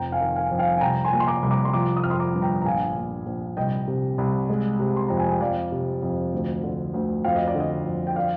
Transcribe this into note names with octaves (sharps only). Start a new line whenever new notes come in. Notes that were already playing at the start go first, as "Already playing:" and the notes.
Already playing: F1 F2 G5 A#5
F5 G#5
D#3
F5 G#5
F2
F5 G#5
G#5
C2 G5 A#5
G#5 C6
A#2
C6
A#5 D6
C2
A#5 D6
C6
F3 A#5 D6
D#6
F2 F6
C6 D#6
A#5 D6
G1
G5 A#5
A#5
A#1 F5 G#5
A#2
A#1
C2 D#5 G5
C3
C2
G#3
C3
C6
F2 A#5
G#5
G5
F2 D5 F5
C3
F2
D2
D3
D2
F2 F5
D#5
D5
D3
D#5
F2
G5
D5 F5